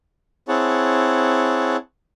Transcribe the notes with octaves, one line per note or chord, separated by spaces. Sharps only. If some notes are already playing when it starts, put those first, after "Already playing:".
C4 E4 G#4 C#5 F#5 A5